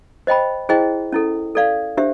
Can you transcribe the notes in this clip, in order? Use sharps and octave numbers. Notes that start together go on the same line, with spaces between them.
C5 D#5 G5 B5
E4 G#4 C5 D#5 G5
C#4 E4 A4
A4 D5 F5
D4 G4 C5 E5